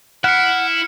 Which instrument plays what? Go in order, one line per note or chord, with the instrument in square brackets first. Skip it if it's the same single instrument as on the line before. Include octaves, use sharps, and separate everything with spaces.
[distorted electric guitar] E4 [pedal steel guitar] F#5 [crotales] F6 C#7